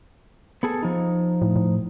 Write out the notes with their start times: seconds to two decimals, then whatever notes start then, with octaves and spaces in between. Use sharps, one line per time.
0.63 B3 G#4 A4
0.82 F3 D#4
1.42 A2
1.56 A2